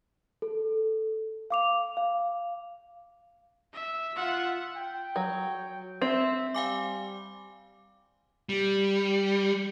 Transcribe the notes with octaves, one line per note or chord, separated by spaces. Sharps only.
A4
F5 D6 F7
F5
E5
F4 E5 F#5
G5
F#3
C4 E5
G3 F5 G#5 D6
G3